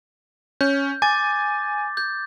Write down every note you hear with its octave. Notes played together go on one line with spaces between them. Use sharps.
C#4 G6
G#5 D6 A6
G6